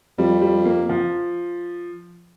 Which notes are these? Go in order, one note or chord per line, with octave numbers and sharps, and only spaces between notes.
F2 G3
G3
A#3
F3